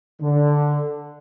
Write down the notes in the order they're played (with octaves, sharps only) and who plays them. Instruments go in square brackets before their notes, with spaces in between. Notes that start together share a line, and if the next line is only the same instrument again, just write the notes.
[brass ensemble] D3